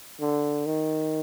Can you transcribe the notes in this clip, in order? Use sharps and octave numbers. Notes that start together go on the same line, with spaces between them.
D3
D#3